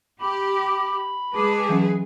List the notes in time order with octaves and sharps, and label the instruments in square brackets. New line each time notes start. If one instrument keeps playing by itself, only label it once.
[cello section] G4 [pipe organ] B5 [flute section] D6
[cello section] G#3 G#4 B4 [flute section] A5 D6
[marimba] E3 F#3 C#4